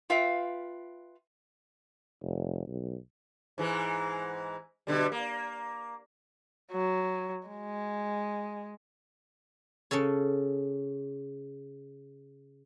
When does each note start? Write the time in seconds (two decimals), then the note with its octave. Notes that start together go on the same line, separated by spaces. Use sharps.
0.10 F4 B4 E5 F5 G5
2.23 F1
2.67 B1
3.58 G#2 E3 G#3
4.87 B2 D3 G3
5.12 A#3
6.72 F#3
7.48 G#3
9.91 C#3 C#4 A4 C#5